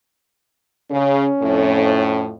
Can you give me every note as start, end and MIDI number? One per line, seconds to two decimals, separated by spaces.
0.91 1.26 49
0.91 2.24 61
1.42 2.32 41
1.42 2.32 45